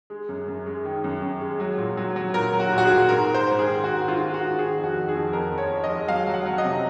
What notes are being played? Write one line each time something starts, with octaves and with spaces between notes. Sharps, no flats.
G#3
F#2
F#2
G#3
D#3
F#2
F#2
G#3
F#3
A#2
F#3
F#3
A#2 A#4
F#3
F#4
A#2
F#4
G#4
A#2
G#2 A#4
G#2
C5
G#2
G#4
D#3
G#2 F#4
D#3
F4
G#3
F#4
G#2
D#3 G#4
F2
F#4
D#3
G#4
F2
F2 A#4
F2
C#5
F2
D#5
G#3
F#3 F5
F#3
F#5
F#3
D#5
C3